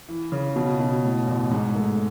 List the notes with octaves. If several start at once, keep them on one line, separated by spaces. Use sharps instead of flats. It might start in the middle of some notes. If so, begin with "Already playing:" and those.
E3
C#3
B2
B2
A2
A1
G#2
A3